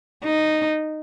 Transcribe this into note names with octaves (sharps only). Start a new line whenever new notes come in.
D#4